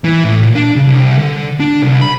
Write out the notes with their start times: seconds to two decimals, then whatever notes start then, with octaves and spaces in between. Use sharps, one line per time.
0.04 E3
0.24 A2
0.43 A#2
0.56 D4
0.76 C#3
0.88 C2
1.19 D3
1.60 D4
1.82 C2
2.01 B5